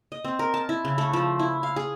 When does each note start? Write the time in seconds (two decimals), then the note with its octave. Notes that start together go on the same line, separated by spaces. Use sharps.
0.12 D#5
0.25 C4
0.39 A#4
0.54 A5
0.69 E4
0.85 C#3
0.98 A3
1.13 F3
1.40 E4
1.63 F5
1.76 G#4